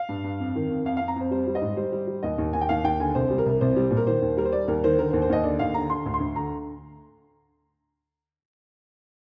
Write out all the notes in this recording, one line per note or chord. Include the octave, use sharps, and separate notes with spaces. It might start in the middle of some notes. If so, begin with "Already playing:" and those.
Already playing: F5
G2
G2
F2
D#3
F2
F2 F5
F2 F5
A#5
F2 C5
G3 C5
G3
D#5
G#2
G3 C5
G3
G3
D#2 D#5
D#2
D#2 G#5
G5
D#2 F5
D#2 G5
D3 G#5
C2 C5
G3
A#4
C2
C2 C5
G3
A#2
A#4
D#3 C5
D#2
G3 A#4
C5
G3 D5
D#2 A#4
D#3 C5
D3 A#4
C5
D#2
C5
D#2 D#5
D3 D5
D#2 F5
D3 A#5
D3 C6
D2
C6
D2
D3 A#5